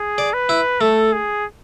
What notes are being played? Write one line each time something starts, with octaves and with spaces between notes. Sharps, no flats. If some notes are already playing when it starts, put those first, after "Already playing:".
Already playing: G#4
D5
B4
E4
A3 A4
G#4